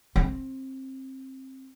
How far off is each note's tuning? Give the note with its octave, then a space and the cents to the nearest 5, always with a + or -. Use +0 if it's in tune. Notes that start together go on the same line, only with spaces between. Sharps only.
C4 +20